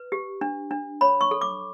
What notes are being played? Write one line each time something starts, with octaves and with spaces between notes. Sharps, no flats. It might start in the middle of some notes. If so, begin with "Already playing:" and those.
Already playing: B4
G4
D4
D4
C#5 B5
C#6
A4
D6